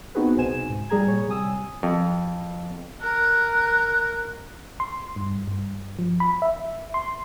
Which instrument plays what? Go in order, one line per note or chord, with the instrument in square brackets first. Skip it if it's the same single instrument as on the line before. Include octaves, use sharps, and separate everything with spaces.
[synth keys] B3 C4 D#4 F#4 G#4 B4
C2 B2 D#4 C5 G#5 E7
C#2 G#2
G3 G#4 A#5 G#6
A#2 C#5
C3 G3 G#5 D#6 E6
[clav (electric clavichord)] F2
[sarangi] A#4 [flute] F#6
[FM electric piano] C6
G2
G2
F3
B5
E5
C6